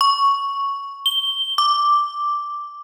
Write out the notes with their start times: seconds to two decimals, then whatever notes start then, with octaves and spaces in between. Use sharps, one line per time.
0.01 C#6
1.06 G7
1.58 D6